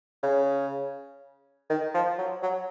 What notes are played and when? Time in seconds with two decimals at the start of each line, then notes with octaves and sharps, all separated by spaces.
0.23 C#3
1.70 D#3
1.94 F3
2.18 F#3
2.42 F#3